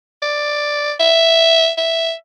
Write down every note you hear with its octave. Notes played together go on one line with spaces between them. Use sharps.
D5
E5
E5